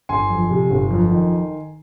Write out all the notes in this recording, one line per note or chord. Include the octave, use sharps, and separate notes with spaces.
G1 G#5 C6
F2
C3
G1
F2
D#3